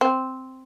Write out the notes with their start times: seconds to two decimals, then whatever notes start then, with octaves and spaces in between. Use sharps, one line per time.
0.01 C4